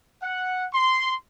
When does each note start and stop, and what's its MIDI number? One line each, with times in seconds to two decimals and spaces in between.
0.22 0.65 78
0.74 1.14 84